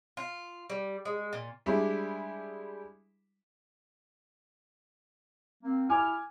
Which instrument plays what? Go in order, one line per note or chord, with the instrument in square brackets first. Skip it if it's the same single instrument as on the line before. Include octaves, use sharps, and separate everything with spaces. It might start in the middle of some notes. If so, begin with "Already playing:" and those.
[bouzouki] F4
G3
G#3
A#2
[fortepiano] G3 G#3 D4 E4
[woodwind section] A#3 C4
[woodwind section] E4 F6 [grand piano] G#5 D6